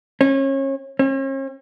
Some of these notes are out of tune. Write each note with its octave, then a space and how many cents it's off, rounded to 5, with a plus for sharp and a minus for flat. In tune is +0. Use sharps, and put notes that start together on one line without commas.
C#4 -30
C#4 -45